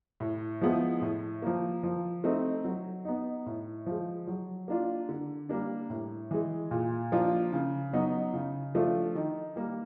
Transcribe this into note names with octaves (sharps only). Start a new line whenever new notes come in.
A2
F3 G#3 B3 E4
A2
F3 A#3
F3
A3 C4 D#4
F#3
B3 D#4
A2
F3 G#3
F#3
A#3 D4 F4
D3
G3 A#3 D4
A2
E3 G#3
A#2
F3 A#3 D4 F4
C#3
F#3 B3 D#4
C#3
F3 A3 D4 F4
D#3
G3 A#3